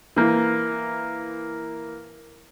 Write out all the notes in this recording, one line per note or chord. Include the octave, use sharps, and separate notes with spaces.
E3 A#3